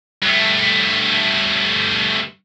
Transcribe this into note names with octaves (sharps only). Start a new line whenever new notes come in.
G2 A3